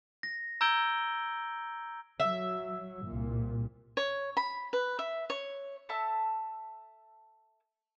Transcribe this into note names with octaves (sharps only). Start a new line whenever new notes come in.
A#6
A#5 E6 G6 G#6 D7 G7
F#3 E5
C2 A#2
C#5
B5
B4
E5
C#5
A4 E5 A5 E6